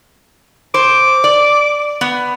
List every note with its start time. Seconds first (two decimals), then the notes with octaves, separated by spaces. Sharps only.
0.74 C5 D6
1.24 D5
2.01 B3